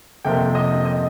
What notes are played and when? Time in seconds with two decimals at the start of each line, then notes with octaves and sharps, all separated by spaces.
0.25 F2 C3 F3 A#3 G5
0.55 D#5
0.85 D#5